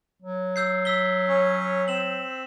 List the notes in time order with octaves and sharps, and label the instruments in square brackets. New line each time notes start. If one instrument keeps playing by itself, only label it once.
[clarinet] F#3
[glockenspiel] E6 G6 C7
E6 B6 G7
[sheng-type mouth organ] C#4 C#5
[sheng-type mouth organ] C4 [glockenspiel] E7 F#7